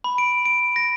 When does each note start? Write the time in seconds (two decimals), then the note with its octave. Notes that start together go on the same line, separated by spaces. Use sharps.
0.04 B5
0.18 D7
0.45 D7
0.76 A#6